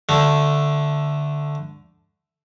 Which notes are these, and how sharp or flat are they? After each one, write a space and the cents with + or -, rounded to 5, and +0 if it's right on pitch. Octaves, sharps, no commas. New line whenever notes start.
D3 +0 A3 +0